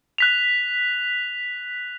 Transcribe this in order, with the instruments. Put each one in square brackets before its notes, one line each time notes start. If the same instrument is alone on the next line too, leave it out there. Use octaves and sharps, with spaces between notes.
[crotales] F#6 B6 F7